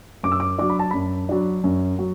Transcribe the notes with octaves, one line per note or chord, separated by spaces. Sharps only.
F#2 D6
E6
D6
F#3 D4 D6
B5
A5
F#2 B5
F#3 D4
F#2
F#3